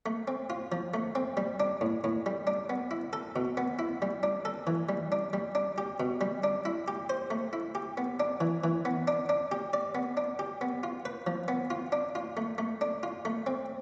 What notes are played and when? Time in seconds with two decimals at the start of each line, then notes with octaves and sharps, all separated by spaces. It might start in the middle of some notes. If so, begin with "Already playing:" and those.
0.06 A3
0.28 C4
0.50 F4
0.72 F3
0.94 A3
1.15 C4
1.37 G3
1.60 D4
1.81 A2
2.04 A2
2.26 G3
2.47 D4
2.70 B3
2.91 E4
3.13 A4
3.36 B2
3.57 B3
3.79 E4
4.02 G3
4.23 D4
4.45 A4
4.67 E3
4.89 G3
5.12 D4
5.33 G3
5.55 D4
5.78 G4
6.00 B2
6.21 G3
6.44 D4
6.65 E4
6.88 G4
7.10 C5
7.31 A3
7.53 E4
7.75 G4
7.97 B3
8.20 D4
8.41 E3
8.64 E3
8.85 B3
9.08 D4
9.29 D4
9.52 G4
9.73 D5
9.95 B3
10.17 D4
10.39 G4
10.61 B3
10.83 F4
11.05 B4
11.27 F3
11.48 B3
11.70 F4
11.92 D4
12.15 F4
12.37 A3
12.58 A3
12.81 D4
13.03 F4
13.25 A3
13.47 C4